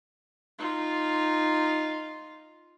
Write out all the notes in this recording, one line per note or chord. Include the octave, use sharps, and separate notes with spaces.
D#4 F4